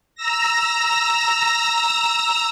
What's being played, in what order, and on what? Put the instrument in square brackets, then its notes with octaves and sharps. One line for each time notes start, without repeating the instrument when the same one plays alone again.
[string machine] A#5 E6 A#6